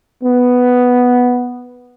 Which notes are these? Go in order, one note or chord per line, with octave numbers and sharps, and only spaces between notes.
B3